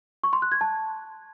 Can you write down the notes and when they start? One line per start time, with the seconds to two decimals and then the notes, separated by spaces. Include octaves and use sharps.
0.24 C#6
0.33 C6
0.42 F#6
0.52 G#6
0.61 A5